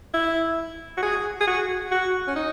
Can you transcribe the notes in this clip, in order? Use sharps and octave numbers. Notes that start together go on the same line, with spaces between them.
E4
F#4
G#4
G#4
F#4
F#4
C#4
D#4